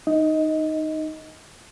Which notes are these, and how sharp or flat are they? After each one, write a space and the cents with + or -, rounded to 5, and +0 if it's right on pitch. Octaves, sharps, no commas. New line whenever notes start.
D#4 -5 D#5 +15